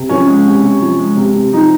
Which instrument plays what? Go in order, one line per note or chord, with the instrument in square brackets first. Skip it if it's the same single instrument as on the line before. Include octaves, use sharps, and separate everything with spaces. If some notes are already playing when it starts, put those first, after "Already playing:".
Already playing: [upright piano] C3
F3 C#4
G#3
C3
C3
F3
G#3
C3
C3
F3 D#4